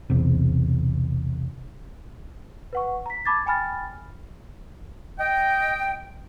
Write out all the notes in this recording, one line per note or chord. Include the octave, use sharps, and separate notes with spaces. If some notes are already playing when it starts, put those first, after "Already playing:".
B1 E2 C3
B4 F#5 C#6
A#5 B6
A5 B5 D6 G#6 A6
G5 G#5 B5 F6 A6
D#5 G5